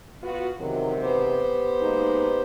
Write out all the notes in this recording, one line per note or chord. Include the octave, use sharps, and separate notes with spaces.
B3 F4 F#4
E2 G#2 C3 D#3 F#3
B3 G4 C5
G#3 A#3 D#4